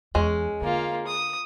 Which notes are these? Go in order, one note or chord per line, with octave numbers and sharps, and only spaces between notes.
E2 G#3 C#4
D3 A#3 F4
D#6